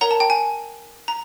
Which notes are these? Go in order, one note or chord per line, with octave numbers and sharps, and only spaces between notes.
A#4 C#5 F#5 A#5
A5
G5
G#5
A#5